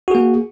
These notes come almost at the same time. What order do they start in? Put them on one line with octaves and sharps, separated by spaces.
F#4 G#4 A#3